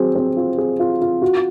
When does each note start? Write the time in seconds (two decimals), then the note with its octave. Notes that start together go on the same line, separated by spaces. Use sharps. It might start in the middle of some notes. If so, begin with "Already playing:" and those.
Already playing: F#3 C4 G#4
0.16 C4
0.37 F4
0.58 G#4
0.79 F4
1.01 F4
1.22 F#4